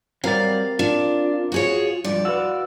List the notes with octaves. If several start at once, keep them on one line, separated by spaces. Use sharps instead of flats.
F#3 G3 C4 A#4 D5 F5 A6
D4 F4
F#4 G#4 C#5
G2 F3 D5
F#4 B4 F5 F#5 E6